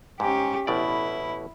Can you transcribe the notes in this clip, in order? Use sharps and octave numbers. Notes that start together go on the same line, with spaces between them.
G#2 C#4 G4
A1 B2 E4 D5